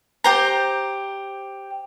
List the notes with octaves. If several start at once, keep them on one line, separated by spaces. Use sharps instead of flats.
G4 C5 A#5